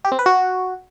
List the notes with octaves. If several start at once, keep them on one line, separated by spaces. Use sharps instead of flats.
G4
C4
B4
F#4